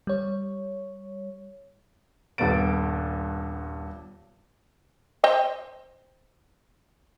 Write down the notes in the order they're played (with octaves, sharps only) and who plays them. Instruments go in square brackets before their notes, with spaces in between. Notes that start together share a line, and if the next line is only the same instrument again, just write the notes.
[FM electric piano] G3 C#5
[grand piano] D#1 G2 B3 A6 D7
[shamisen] C5 D#5 G5